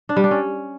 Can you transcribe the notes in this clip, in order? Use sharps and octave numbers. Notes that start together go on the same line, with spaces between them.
D4
G3
D4
C#4